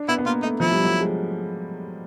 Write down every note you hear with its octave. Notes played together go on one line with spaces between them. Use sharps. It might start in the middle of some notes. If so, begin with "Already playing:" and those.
Already playing: D4
B3 E4
B3
A#3 F4
A3 D#4
F3 E4
G3
F#3
G#3